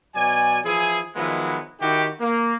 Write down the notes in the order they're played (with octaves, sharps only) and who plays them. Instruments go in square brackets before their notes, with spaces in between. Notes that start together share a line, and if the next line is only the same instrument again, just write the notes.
[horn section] B2 F#3 D5 G#5
E3 F3 E4 G#4
D#3 F3 F#3 G#3 B3 E4
D#3 E4 F#4 G4
A#3